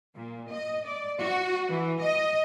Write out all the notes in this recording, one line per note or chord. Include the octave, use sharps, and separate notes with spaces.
A#2
D#5
D5
F#4
E3
D#5